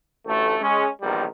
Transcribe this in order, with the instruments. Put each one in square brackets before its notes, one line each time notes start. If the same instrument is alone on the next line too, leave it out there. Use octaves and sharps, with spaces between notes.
[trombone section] A1 D2 A3
G#3 C#4
A#1 E2 D#3 G3